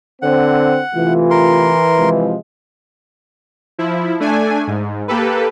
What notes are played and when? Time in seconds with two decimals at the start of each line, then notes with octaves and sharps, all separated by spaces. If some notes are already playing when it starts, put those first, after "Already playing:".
0.22 D3 C4 F#5
0.94 C3 E3 A3 F4
1.31 A#4 C6
1.98 C3 F3 G#3
3.78 F3 E4
4.20 A3 D4 G#5
4.67 G#2
5.08 A#3 G4 A4 B4